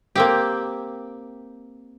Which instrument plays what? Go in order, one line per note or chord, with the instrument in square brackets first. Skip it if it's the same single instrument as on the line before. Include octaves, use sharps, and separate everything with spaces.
[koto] A#3 C4 G4